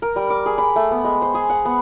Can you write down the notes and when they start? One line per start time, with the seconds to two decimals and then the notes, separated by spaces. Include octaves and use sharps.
0.02 A#4
0.16 G3
0.30 D6
0.46 G#4
0.58 B5
0.76 A3
0.91 B3
1.05 G#3
1.22 C5
1.34 G#4
1.50 F#5
1.65 B3